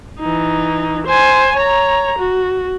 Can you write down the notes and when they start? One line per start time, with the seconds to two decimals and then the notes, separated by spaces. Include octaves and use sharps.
0.20 E3 D#4
1.07 C5 G#5
1.56 C#5 A#5
2.19 F#4